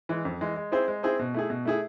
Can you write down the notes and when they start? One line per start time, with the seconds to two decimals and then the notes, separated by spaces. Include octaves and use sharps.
0.09 E3 G#3
0.25 F2
0.41 E3 G#3
0.56 G#3
0.72 C4 E4 G#4 C5
0.88 G#3
1.03 C4 E4 G#4 C5
1.19 B2
1.34 A3 E4 G#4
1.50 B2
1.65 A3 E4 G#4